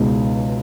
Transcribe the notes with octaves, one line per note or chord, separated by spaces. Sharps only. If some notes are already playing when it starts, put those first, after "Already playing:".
Already playing: C#2 B2 G#3 D#4